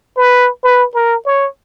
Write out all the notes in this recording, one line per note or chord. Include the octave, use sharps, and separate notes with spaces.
B4
B4
A#4
C#5